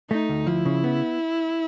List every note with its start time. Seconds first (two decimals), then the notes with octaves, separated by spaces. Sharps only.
0.10 A3 D#4
0.29 D2
0.47 F3 E4
0.65 C#3
0.84 B3